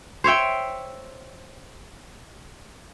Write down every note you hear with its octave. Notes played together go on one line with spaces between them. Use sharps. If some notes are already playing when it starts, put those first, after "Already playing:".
C5 C#5 E5 G5